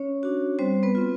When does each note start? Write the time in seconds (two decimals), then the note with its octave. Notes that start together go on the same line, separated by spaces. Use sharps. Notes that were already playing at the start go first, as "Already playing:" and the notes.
Already playing: C#4 C#5
0.23 D4 F#4
0.59 G3 C4 C5
0.83 B3 B4
0.95 C4 F4